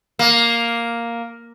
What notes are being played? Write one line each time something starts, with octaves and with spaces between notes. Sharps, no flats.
A#3